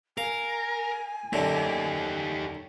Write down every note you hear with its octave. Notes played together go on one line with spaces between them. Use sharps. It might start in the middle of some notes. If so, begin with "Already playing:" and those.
A#4 F5 G#5
F#2 D3 D#4 G4